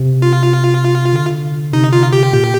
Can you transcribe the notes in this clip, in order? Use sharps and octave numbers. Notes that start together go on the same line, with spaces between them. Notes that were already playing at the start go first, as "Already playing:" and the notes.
Already playing: C3
F4
D3
C3 D#4
F4
G4
A#2